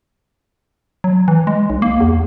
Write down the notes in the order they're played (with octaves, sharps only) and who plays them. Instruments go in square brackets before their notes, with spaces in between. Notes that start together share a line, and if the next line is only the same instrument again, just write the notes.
[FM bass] F#3
E3
G#3
B1
A#3
E2